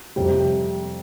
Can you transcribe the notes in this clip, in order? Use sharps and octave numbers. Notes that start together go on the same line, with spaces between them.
F2 C3 G3